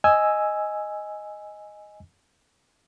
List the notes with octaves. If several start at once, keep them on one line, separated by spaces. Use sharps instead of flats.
D#5 G#5 E6